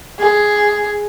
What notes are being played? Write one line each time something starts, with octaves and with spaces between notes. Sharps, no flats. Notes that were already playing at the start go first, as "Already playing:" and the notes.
G#4